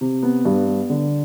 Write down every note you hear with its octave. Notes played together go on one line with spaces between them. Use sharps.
C3
B3
G2
B3
D3